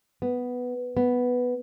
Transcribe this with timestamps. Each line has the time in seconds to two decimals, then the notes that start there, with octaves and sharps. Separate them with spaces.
0.22 B3
0.97 B3